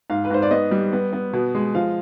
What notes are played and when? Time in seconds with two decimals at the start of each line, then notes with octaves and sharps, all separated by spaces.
0.10 G#2 F5
0.25 B4
0.30 G#2 C5
0.42 D5
0.51 B3 D#5
0.71 G3
0.93 B3
1.13 B3
1.33 B2
1.55 G#3
1.75 F3 F5